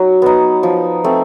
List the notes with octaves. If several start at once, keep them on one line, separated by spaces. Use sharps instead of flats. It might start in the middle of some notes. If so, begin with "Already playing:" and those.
Already playing: F#3 D#4
B3 D#4
F3
A3 C4